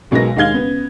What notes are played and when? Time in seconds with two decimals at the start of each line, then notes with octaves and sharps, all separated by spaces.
0.11 B1 B2 G#3 B3 A#4 A#6
0.36 D#2 G#3 F5 G#6 G7
0.54 C#3 B3